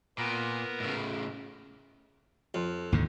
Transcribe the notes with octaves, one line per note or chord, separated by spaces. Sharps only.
A#2 B3 A#4
A2 C#3
F2
D#2 G#2 D3